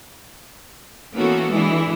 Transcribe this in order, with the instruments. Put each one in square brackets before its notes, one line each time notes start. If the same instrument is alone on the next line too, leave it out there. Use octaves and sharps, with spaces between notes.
[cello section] E3 A#3 B3 C#4 F#4 A4
E3 G#3 D4 E4